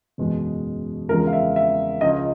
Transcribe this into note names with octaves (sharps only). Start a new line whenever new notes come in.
F#1 E2 B2 G#3
E2 C#3 F3 G#3 A#4
F5
E5
E5
C#2 C#3 F3 D#5